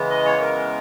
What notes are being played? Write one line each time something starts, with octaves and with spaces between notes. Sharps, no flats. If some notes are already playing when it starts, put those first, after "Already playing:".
Already playing: C#3 E3 G#3 B3
D#5
C#5
A#4